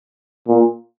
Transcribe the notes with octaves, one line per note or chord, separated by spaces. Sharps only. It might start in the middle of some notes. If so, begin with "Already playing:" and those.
A#2